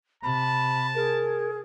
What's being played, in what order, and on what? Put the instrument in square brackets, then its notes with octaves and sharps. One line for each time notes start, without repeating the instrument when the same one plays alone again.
[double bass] C3 [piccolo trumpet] A5 [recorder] B5
[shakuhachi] G#4 [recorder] A#4